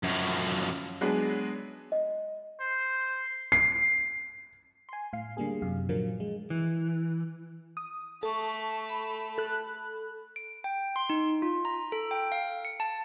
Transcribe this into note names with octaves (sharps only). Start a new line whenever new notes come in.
F#2 F3
F#3 G#3 B3 D4 G#4
D#5
C5
C7
G#5 C6
A2 F5 C7
D3 G3 A#3 G#4
F#2 C3 F5
A#2 D3 F3 F#3 A#3
G#3
E3
D#6
A3 A4 A5 C#6
B5
A4 F#6
D7
G5
C6
D#4
F4
A#5
A4
G5
F5
C#7
A5